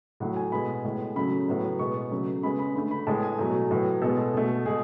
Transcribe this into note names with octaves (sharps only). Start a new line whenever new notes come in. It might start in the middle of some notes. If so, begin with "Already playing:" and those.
A2 F#3 A3 F#5
G#5
B2 G#3 B3 B5
A2 G#3 B3
C#3 F#3 A3 B5
A2 F#3 B3
B2 G#3 B3 C#6
C#3 F#3 A3
C#3 G#3 B3 B5
B5
D3 A3 B5
B5
A2 G#3 B3 A5
G#5
B2 F#3 A3
A2 F#3 B3
B2 G#3 B3 A4
B2 A3
B2 G#3 G#4